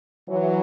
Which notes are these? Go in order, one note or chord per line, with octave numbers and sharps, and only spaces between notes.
E3 F#3